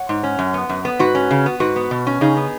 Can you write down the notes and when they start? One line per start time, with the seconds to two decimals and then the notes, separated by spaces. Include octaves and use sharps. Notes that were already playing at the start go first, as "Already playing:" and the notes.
Already playing: C#5 F#5
0.09 G#2
0.23 C#4
0.39 F#2
0.54 B3
0.69 F#2
0.85 B3
0.99 G#2 F#4 B4
1.15 C#4
1.31 C#3
1.46 B3
1.60 G#2 F#4 B4
1.76 B3
1.91 B2
2.07 C#4
2.21 C#3 D#4 G#4
2.36 B3